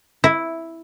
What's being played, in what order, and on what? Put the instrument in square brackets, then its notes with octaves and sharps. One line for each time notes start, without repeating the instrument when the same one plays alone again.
[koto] E4